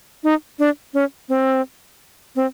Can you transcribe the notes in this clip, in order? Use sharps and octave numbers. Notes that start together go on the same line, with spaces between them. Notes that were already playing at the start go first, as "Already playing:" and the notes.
D#4
D4
C#4
C4
C4